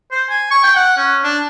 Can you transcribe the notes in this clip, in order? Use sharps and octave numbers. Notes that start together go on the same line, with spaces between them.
C5
G#5
C#6
G5
F#5
C#4
D4